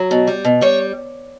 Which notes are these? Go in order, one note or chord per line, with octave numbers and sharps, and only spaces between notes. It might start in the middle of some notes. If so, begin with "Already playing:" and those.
Already playing: F#3
B2
G3
B2
G3 C#5